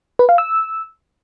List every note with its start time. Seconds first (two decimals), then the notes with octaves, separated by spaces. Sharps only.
0.19 B4
0.29 F5
0.38 E6